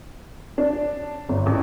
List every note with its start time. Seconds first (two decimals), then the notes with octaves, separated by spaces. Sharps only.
0.58 D4
1.29 G1
1.46 A1